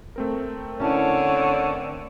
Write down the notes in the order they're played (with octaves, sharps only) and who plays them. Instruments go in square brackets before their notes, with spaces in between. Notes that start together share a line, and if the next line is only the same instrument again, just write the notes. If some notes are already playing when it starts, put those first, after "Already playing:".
[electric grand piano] A3 C4 A#4
[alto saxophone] D3 [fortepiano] C#4 E4 A5 [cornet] C#5